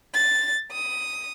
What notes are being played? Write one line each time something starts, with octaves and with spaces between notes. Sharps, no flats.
A6
D#6